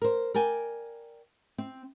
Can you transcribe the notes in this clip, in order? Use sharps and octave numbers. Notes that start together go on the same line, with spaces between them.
A#4 C5
A#4 D5 G5 G#5
C4